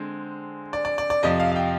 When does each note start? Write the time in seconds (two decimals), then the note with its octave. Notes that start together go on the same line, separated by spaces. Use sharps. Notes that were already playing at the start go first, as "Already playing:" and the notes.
Already playing: D3 G#3 C4 C5
0.73 D5
0.85 D5
0.98 D5
1.10 D5
1.23 F2 C3 F3 D#5
1.40 F5
1.52 F5
1.56 G5